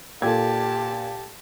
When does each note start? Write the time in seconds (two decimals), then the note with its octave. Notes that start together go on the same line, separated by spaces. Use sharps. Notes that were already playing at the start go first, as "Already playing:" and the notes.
0.22 A#2 G4 A4 A5 G#6